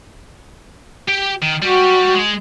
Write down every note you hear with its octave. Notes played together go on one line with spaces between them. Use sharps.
G4 G5
D#3
G3 F#4 G4
G#3 G#4